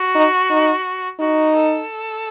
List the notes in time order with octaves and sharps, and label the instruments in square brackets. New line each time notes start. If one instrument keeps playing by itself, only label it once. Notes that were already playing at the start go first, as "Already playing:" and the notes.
Already playing: [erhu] F#4
[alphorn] D#4
D#4
[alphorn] D#4 [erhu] F#4
[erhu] A4